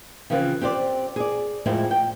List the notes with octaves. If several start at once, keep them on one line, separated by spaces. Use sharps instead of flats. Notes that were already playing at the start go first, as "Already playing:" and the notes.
C#3 E3 F3 C4 F4 B4
C4 G4 C5 D5
G#4 D5
F2 A2 G#3 C4 E4
G5